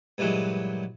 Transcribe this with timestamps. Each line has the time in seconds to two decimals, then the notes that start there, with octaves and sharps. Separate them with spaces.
0.18 G2 A#2 E3 F#3 G#3